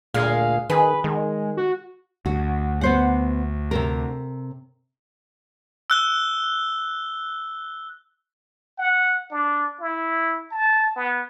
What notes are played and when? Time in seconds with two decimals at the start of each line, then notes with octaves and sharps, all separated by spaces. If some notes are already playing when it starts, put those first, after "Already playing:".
0.14 D2 A#2 G#3 F5
0.70 D#3 G#4 B4
1.04 D#3 G#3
1.57 F#4
2.26 D2 F#4
2.81 B3 C5 F#5
3.71 C3 A4 A#4
5.90 E6 F#6 G7
8.79 F#5
9.31 D4
9.80 E4
10.51 A5
10.96 B3